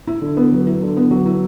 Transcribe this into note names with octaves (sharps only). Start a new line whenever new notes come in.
E4
D3
B3
F#3
E4
D3
B3
F#3
E4